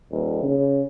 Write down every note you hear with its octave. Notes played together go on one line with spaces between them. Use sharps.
D#1
C#3